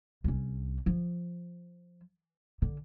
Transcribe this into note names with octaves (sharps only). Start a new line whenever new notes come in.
C2 C#4
F3
D3